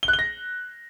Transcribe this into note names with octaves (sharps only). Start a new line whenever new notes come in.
G7
F#6
G7
A#6